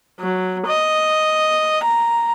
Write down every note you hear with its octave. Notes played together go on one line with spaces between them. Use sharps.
F#3
D#5
A#5